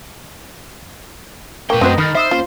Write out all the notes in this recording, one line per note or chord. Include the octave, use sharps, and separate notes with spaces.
A#2 A#3 A#4 B4 G5 C#6
F#2 A3 C4 F#4 A4 A#4 C5 D#5
D#3 D#4 B5 F6 A6
C5 E5 D#6 E6
A#3 C#4 F4